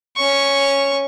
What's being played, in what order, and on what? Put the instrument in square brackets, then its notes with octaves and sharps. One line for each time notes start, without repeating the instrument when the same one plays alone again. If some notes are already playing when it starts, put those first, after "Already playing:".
[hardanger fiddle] C#4 C#6